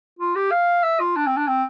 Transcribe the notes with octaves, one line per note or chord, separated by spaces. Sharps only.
F4
G4
F5
E5
F4
D4
C4
D4
C4